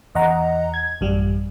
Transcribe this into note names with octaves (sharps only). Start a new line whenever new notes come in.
E2 D#5 F#5 A#5
G#6
A1 F#2 G3